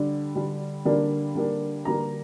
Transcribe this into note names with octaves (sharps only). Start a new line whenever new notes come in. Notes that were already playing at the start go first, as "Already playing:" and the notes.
Already playing: D3 G3 D4
D3 G3 D4
D3 G3 A#3 D4
D3 G3 A#3 D4
D3 G3 A#3 D4 A#5